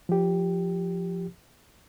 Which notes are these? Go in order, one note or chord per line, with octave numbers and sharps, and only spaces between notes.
F3 G4